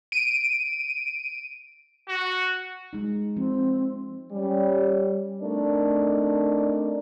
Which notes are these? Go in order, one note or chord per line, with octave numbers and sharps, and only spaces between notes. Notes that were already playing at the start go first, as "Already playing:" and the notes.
D7 D#7
F#4
G#3 D#4
F3 C4
G3 C#4
A3 C4 D4 D#4 A#4 D5